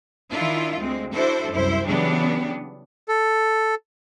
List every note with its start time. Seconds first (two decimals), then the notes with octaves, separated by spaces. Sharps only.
0.31 D#3 D4 E4 F4
0.80 D2 G#3 C4
1.14 D4 E4 F#4 A4 C5
1.53 C2 F#2 E4 C5
1.85 C#3 E3 F#3 G3 B3 D4
3.08 A4